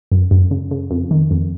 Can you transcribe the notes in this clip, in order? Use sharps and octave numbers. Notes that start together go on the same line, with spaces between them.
F#2
F#2
C#3
C#3
F2
D#3
F2